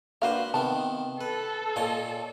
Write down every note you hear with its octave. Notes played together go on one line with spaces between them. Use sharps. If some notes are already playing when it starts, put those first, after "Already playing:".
A#3 D4 F#4 B4 C5 F5
C3 D#3 B3 A5
A4 B4
A#2 C#5 D#5